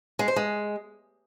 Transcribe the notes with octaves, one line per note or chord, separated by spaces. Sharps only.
G#3
C5
G#3